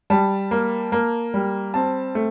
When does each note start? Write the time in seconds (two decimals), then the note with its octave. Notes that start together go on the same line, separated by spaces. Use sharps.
0.10 G3 A5
0.51 A#3
0.92 A#3
1.34 G3
1.74 C4 A5
2.15 A3